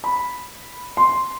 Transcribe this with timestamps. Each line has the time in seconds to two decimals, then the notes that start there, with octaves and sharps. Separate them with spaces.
0.04 B5
0.97 C6